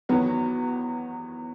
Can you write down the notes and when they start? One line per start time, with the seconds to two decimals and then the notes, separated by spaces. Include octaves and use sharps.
0.09 E2 D#3 F#3 B3 F#4